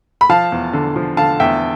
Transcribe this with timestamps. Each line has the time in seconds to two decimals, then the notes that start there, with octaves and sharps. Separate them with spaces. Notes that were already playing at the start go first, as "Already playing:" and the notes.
0.21 B5
0.29 F3 F5 A5
0.52 E2
0.73 D3
0.96 F3
1.17 D3 F5 A5
1.40 E2 E5 G5